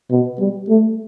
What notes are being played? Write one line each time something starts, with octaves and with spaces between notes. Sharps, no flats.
B2
G3
A3